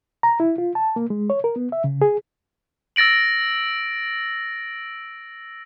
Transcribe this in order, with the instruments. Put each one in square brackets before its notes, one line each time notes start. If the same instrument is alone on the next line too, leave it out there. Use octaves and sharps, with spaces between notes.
[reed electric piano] A#5
E4
F4
A5
A#3
G#3
C#5
A#4
B3
E5
C#3
G#4
[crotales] E6 A6 A#6 D7 F#7